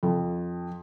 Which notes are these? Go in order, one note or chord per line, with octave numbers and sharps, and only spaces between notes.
F2